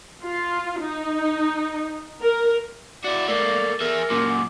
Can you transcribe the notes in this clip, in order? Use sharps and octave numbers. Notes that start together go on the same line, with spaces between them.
F4
D#4
A#4
E4 F#4 D5
A3 A#3 D5
G#4 A#4 E5
F#2 A#2